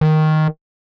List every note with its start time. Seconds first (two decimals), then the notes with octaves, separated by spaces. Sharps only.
0.01 D#3